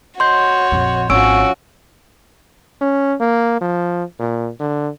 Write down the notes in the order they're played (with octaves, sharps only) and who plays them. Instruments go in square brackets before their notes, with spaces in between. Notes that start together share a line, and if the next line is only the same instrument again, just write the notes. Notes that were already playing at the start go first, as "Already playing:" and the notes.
[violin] F#4 C#5 [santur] D#5 [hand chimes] C6 G6
[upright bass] A#1 F2
[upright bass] G#1 [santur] F3 C#4 [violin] F#4 [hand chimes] E6 D7
[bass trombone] C#4
A#3
F3
A#2
D3